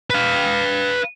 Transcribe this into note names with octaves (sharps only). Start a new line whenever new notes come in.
B4 F5